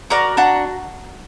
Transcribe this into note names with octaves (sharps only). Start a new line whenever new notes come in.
F#4 A#4 D5
D4 F#5 A#5